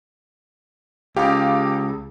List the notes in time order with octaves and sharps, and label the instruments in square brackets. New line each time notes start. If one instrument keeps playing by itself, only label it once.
[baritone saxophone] C#2 [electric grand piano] G4 F5